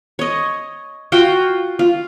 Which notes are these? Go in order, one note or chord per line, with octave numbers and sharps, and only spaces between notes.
C#5 D#5
F4 F#4 G5
F4